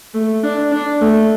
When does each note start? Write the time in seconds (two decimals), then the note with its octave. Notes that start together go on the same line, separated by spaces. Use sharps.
0.14 A3
0.43 D4
0.72 D4
1.01 A3